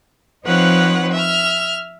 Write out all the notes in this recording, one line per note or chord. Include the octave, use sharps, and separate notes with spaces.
F3 C4 D#4 B4 C#5 F#5
E5 F6